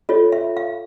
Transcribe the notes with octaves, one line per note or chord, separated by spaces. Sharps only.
F4 A4 C#5 D#5
E5
F5